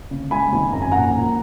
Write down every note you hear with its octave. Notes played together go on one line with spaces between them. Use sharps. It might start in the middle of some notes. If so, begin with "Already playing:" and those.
C#3
G#3 G#5 B5
G#1
F#2 A#5
G#5
A#1 F#5 A#5
A#1